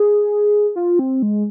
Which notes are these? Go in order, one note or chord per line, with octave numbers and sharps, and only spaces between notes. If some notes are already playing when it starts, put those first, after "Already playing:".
Already playing: G#4
F4
C4
G#3